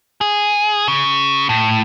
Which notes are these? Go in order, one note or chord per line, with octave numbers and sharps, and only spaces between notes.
G#4
C#3
A2